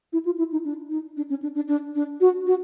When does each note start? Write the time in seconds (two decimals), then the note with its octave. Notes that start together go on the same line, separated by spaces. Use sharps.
0.13 E4
0.25 F4
0.38 E4
0.52 D#4
0.65 D4
0.90 D#4
1.17 D4
1.30 C#4
1.42 D4
1.55 D4
1.68 D4
1.95 D4
2.21 F#4
2.46 F#4